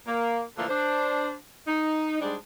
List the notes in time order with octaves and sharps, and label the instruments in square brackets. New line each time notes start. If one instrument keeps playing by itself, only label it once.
[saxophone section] A#3
A#2 D3 E3 F3 A3 A#3
D4 C5
D#4
G#2 G3 G#3 D4